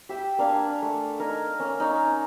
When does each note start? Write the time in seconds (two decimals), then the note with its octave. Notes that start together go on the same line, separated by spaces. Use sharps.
0.09 G4 E5 G5 E6
0.38 A#3 D4 F5 G#5
0.82 A3
1.19 D#4 A#4 G#5
1.59 A#3 C#4
1.80 D#4 C#5